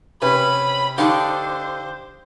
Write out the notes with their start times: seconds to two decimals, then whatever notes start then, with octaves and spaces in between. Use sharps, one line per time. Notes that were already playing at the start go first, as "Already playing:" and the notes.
0.22 C3 C#4 B4 B5
0.98 D3 D4 D#4 G4 C5 F5 C#6